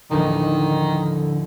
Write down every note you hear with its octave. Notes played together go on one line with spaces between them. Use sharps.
A1 D#2 D3 D#3 F3